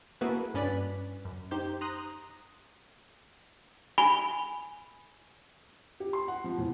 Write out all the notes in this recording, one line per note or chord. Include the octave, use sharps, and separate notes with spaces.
A#3 E4 F#4 G#4 A4 B4
G2 C#4 B4 D5 F#6 B6
F#2
D#4 G4 C5 G6
A#5 C6 D#6 F#6
G#5 B5 G7
G4
C6
F#5
F3
E2